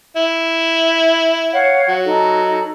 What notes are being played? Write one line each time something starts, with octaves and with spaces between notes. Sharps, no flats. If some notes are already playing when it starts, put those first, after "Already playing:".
E4
C#5 F5 F#5
F#3
D#4 A4